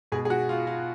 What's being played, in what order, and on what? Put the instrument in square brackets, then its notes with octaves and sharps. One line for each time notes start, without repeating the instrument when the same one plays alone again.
[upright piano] B2 G#3 G#4
G#4
F#4
F4
F4